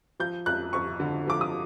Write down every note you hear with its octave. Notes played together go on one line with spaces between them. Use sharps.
F3 G6
F2 F#6
F2 C#6
D3
F3 D6
D#6